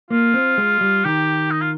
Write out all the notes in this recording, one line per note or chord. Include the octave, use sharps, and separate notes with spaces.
A#3 F4
C4
G#3
G3
D#3 G4
D#4
F4